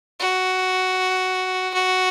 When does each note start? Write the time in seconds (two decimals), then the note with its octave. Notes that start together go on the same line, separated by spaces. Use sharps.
0.20 F#4
1.74 F#4